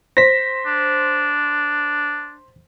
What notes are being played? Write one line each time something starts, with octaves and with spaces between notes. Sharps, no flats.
C5 A#6 B6
D4